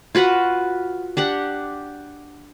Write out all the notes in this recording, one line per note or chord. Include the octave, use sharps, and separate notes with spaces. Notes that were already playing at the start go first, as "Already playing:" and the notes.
F4 F#4 B4 F#5
D4 G4 F#5